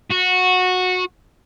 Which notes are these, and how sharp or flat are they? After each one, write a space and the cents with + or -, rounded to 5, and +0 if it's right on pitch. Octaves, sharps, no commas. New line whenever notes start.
F#4 -15